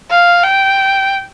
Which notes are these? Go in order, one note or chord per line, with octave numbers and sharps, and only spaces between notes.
F5
G5